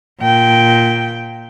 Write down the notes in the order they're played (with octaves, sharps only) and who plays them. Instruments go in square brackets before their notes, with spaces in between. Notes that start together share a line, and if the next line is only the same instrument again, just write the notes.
[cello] A#2 G5